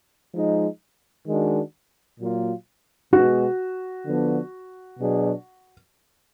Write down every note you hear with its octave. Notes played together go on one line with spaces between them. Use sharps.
F3 G#3 D#4
D#3 G#3 D4 F#4
A#2 F#3 A#3 F4
B2 G#3 B3 F#4
D3 F3 B3 D4
B2 F#3 D4 G#4